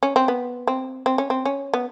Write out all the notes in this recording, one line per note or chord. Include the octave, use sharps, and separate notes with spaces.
C#4
C4
B3
C4
C4
C#4
C4
C#4
B3